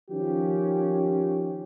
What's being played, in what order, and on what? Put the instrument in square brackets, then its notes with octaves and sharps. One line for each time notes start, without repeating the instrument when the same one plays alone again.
[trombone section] D#3 F3 C#4 G4